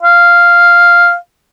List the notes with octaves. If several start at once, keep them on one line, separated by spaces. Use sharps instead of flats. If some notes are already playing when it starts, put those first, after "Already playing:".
F5